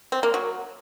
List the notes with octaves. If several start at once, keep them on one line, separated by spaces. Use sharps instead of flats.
C4
A#3
F#3